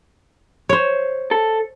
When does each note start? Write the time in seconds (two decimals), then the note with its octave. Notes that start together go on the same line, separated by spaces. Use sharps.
0.69 C5 C#5
1.31 A4